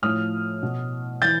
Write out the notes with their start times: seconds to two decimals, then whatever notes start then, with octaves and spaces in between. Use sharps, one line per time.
0.02 A2 F3 D#6 F6
0.63 B2
1.22 E3 G6 A6